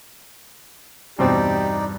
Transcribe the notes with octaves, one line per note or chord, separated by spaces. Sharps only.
E2 G2 B2 C4 D#4 G4 D5